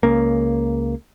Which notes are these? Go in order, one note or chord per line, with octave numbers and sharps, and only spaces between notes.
C#2 C#3 A#3